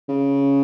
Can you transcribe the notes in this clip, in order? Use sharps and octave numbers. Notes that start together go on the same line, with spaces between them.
C#3